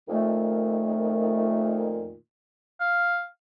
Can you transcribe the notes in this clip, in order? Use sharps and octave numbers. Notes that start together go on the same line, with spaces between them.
F2 A#2 D#3 A3
F5